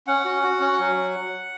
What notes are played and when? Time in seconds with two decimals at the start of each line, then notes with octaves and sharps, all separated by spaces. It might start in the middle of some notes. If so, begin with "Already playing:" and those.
0.07 C#4 F#5
0.25 F#4
0.43 F#4
0.60 C#4
0.79 F#3